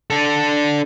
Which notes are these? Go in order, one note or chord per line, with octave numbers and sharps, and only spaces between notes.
D4 A4